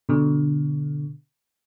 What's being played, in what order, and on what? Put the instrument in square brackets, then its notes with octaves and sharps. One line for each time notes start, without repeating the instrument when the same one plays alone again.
[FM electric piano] B2 D3